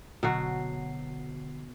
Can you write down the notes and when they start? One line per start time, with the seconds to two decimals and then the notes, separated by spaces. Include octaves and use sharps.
0.23 G1 B2 D3 F#3 F#4 C7